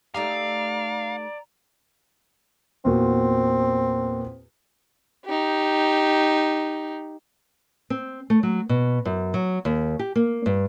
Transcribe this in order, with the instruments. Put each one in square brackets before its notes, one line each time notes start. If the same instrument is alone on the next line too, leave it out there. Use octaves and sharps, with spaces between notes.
[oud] A3 D#4 G4 [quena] D5 [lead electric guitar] F5 [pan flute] A#5
[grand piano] E2 A#2 F#4 [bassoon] C4
[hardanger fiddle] D#4 G4
[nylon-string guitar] C4
A3
F#3
B2
F#2
F#3
D#2
G4
A#3
G2